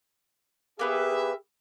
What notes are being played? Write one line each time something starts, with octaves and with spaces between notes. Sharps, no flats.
A#3 B3 G4 G#4 B4 E5